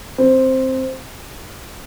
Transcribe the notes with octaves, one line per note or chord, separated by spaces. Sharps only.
C4